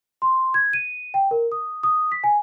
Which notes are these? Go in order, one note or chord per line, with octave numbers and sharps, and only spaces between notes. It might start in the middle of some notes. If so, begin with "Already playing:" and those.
C6
G#6
D#7
G5
A#4
D#6
D#6
B6
G#5